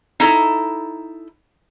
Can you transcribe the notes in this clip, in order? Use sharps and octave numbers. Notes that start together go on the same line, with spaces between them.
D#4 E4 A4 A#5